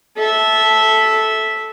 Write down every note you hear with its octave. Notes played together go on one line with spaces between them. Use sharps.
A4 E5